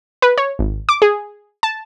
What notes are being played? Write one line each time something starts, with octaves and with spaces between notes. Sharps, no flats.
B4
C#5
G#1
D6
G#4
A5